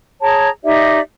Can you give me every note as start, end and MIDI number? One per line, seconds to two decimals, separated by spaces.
0.21 0.49 68
0.21 0.49 73
0.21 0.49 81
0.21 0.49 82
0.64 1.00 63
0.64 1.00 67
0.64 1.00 74
0.64 1.00 76